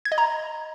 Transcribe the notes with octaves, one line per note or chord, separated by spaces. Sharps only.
G#6
D#5
A#5